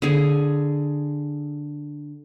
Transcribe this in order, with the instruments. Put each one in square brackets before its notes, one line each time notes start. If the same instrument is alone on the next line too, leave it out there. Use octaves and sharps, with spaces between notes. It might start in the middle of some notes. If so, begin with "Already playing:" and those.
[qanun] D3 G#4